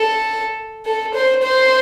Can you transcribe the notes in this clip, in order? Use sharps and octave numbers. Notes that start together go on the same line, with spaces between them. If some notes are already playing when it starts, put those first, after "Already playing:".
Already playing: A4
A4
C5
C5